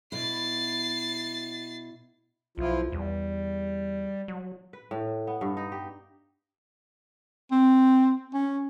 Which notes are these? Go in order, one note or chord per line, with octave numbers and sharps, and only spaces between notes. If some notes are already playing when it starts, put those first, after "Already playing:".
B2 E4 A6 C7
B1 F3 E4 F4
E2 G3
F#3
B4
A2
B3
G2
D#4
G4
C4
C#4